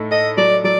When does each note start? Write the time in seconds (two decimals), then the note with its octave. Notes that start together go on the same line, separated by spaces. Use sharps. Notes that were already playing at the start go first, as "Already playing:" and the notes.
Already playing: A2 D#4 A4
0.11 A4 D#5
0.37 F#3 D5
0.64 F#3 D5